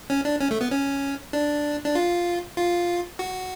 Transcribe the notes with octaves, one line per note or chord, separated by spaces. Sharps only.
C#4
D4
C#4
A3
B3
C#4
D4
D4
F4
F4
F#4